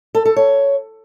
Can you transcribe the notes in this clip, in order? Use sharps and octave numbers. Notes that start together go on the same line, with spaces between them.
A4
A4
C#5